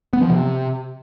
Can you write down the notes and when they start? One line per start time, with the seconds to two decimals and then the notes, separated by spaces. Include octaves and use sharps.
0.13 B3
0.22 F3
0.30 C3